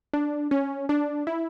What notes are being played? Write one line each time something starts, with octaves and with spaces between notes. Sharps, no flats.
D4
C#4
D4
E4